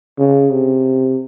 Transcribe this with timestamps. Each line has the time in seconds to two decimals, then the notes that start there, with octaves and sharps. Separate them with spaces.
0.18 C#3
0.51 C3